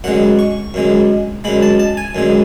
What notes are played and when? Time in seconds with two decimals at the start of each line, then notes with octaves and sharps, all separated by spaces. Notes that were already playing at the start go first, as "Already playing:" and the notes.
0.04 F#2 D3 G#3 F#5
0.39 C#6
0.74 F#2 D3 G#3
1.44 F#2 D3 G#3 B5
1.62 A5
1.80 A5
1.97 G#5
2.15 F#2 D3 G#3